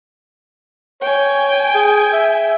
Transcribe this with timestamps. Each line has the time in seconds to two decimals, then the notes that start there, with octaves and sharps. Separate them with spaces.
1.01 C#5 G5 G#5
1.74 G#4
2.13 E5